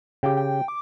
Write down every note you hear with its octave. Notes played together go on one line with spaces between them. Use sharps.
C#3 G4 G5
G5
D6